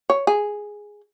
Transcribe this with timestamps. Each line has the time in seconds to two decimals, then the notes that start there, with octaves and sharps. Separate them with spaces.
0.10 C#5
0.27 G#4